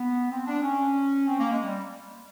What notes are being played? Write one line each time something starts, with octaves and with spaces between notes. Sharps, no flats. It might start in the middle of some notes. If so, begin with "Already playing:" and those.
Already playing: B3
C4
D4
C#4
C4
A#3
G#3
G3